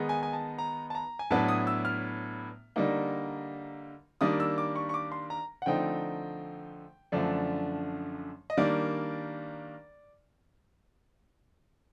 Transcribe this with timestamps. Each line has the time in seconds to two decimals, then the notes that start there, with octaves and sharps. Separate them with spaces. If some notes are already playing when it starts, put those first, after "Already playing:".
Already playing: D#3 G#3 B3 D#4
0.09 G#5
0.23 G#5
0.33 A5
0.58 A#5
0.90 A5
0.95 A#5
1.19 G#5
1.31 A2 F#3 B3 D4 A5
1.48 D#6
1.67 E6
1.85 F6
2.76 D3 G3 A#3 D#4
4.21 D#3 G3 A#3 D4 D#6
4.40 E6
4.58 D6
4.75 C#6
4.89 C#6
4.94 D6
5.12 C6
5.30 A#5
5.62 F#5
5.66 D3 F3 A3 C4 D#4 G5
7.12 F#2 D3 F3 A3 D4
8.50 D#5
8.57 D#3 G3 A#3 D4 D5